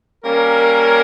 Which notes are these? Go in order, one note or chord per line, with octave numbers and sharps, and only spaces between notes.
G3 A#3 C#4 A#4